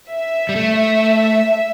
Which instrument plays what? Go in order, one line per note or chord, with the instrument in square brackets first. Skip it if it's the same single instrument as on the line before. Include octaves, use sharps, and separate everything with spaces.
[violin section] E5
[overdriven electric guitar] G3
A3